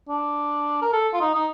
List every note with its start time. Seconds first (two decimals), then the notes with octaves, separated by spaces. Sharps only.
0.09 D4
0.82 A#4
0.93 A4
1.13 F4
1.21 D#4
1.35 D#4